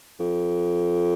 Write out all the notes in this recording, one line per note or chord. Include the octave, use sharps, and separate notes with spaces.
F2